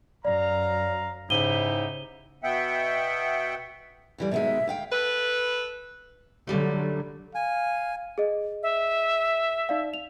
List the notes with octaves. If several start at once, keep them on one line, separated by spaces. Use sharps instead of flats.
F#2 D5 F5 A#5
G#2 C#3 D#4 E4 G4 D#7 G7
B2 B3 E5 F#5 G5
F2 E3 G3
B2 D#3 G#3 E5
D2 F5 G5
A4 B4
F#2 D3 F#3 G3 A3
F5 G#5
G#4 D#5
E5
D#4 D5 F5
F7